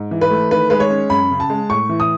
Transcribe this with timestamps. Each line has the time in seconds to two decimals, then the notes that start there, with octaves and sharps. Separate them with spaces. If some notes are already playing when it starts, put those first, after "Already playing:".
Already playing: G#2
0.11 E3
0.21 B4
0.30 A3
0.51 D#3 B4
0.70 G#3 B4
0.80 C#5
0.90 C#4
1.10 F#2 B5
1.31 C#3
1.40 A5
1.50 G#3
1.69 A2 C#6
1.89 E3
2.00 D#6